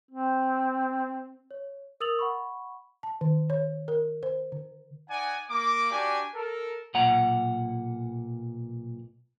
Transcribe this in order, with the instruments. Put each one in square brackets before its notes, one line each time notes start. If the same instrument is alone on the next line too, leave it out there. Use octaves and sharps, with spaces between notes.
[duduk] C4
[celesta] C#5
A#4 D#6 E6 A6 F7 F#7
F#5 B5 C#6
[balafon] A5
D#3
C#5
A#4
C5
D3
[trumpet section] D#4 D5 F#5 G#5
A#3 D6
D4 F#4 G4 D5 G#5
A4 A#4
[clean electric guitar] B1 A#2 F#5 A#5